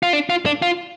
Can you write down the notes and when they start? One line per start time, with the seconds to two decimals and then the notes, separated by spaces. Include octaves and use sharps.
0.03 F4
0.13 D4
0.30 F4
0.46 D4
0.62 F4